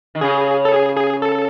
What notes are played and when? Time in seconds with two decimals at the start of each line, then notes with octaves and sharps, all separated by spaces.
0.15 D#3
0.21 C#3 G#4
0.65 A4
0.73 G#4
0.97 G#4
1.22 A4